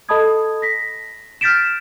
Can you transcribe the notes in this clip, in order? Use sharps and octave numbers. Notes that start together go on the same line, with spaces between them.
A4 D#5 A5 B5 D#6 G#6
A#6 B6
F6 G6 A6 B6 D7 E7